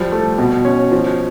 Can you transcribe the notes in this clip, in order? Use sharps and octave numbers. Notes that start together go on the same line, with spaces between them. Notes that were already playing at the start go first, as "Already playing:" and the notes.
Already playing: F3 G3
A3
B2
C#4
F3